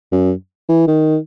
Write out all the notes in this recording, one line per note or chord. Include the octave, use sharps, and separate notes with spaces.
F#2
E3
D#3